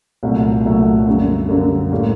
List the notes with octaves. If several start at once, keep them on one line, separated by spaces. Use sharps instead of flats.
C2 A#2 F#3 A3
C2 A#2 F#3 A3
F#2 D3 G3 A#3
F#2 D3 G3 A#3
A2 G3 A#3